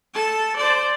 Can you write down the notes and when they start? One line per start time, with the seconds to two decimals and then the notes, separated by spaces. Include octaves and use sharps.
0.14 A4 A5
0.56 C5 D5